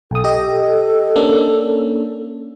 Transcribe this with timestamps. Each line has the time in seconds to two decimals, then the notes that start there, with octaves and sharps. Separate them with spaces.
0.11 B1 A4 D#6
0.24 G4 D#5
1.16 A#3 C#4 D4